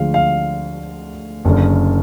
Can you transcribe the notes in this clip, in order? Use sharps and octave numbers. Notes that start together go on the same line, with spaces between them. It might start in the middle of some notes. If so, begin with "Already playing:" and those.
Already playing: D2 D3 F3 G#3 F5
F5
F#1 F#2 D3